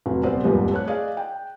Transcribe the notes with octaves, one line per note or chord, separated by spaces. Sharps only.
F1 F#3
D#1 C3 B3 C4 C5 D5
F1 D#2 G#2 F3 G3 B4
A3 C#5 F#6
G#4 D5 D#5 F5
G5